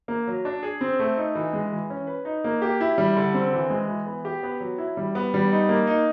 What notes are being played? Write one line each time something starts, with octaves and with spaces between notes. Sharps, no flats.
A#3
F#3
D4
G#4
C4
A3
D#4
E3
G#3
E3
C#4
B4
D#4
A#3
G4
E4
G3
D3
C4
E3
G#3
E3
B3
G4
B3
F#3
E4
G3
B3
G3
D#4
A#3
D#4